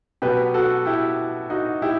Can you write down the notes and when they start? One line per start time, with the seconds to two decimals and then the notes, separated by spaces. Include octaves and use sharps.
0.22 B2 F#3 B3 G4 B4
0.54 F#4 A4
0.86 E4 G4
1.50 D#4 F#4
1.82 E4 G4